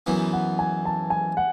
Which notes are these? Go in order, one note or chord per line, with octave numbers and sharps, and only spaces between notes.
F#2 E3 B3
F#5
G#5
A5
G#5
F#5